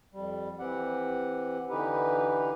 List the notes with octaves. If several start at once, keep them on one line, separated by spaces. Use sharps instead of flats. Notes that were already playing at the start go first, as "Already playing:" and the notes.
F2 G3
E3 C4 G4 F#5
D3 E3 D#4 G4 B4